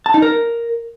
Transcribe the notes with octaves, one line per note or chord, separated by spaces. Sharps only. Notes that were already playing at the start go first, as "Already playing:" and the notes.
A5
D#4
A#4